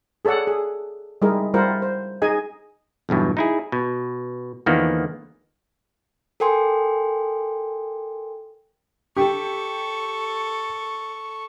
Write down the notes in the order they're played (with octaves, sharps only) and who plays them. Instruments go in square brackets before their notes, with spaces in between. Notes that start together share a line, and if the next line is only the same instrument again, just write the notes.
[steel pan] G#4 A4 C#5 D5 F#5
G#4
G3 G#3 D#4 E4 G#4 A#4
G3 E4 F4 A#4 C5 F#5
C5
D#4 G#4 D#5 G#5
[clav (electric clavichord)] B1 E2 G2 B2
D#4 E4 G#4
B2
E2 D3 D#3 F3 A#3 B3
[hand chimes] A4 A#4 G5 G#5 C6
[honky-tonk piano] G4 [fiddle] A4 C#6